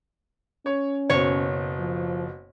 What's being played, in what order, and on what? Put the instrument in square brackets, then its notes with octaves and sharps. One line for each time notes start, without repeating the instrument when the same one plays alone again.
[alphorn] C#4 [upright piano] C#5
[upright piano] F#1 B2 [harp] C#5
[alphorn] F3